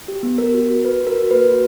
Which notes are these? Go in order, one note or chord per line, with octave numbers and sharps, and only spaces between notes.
G4
B3
B3 A#4
F#4
F#4
F#4 B4
F#4
A#4
F#4
A#3 B4
F#4